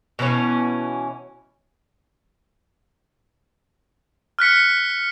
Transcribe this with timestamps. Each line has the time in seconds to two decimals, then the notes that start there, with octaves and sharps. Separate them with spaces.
0.19 B2 E3 A#3 C#4
4.39 F6 F#6 B6 C#7